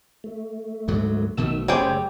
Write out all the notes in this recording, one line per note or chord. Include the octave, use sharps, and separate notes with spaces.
A3
D2 G#2 F#3
B1 B2 D#3 A3 E6
F#1 C#3 G3 A3 G#4 C5 C#5 G5